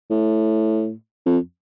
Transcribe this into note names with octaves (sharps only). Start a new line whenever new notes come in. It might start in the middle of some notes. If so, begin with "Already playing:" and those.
A2
F2